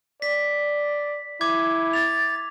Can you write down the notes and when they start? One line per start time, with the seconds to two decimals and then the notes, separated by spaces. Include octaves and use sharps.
0.22 D5 B6
1.41 E4 D6 G#6
1.93 A6 F7